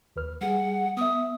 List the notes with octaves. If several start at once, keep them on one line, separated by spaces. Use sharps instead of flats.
D#2 B4 F6
G3 G#4 F#5
B3 E5 D#6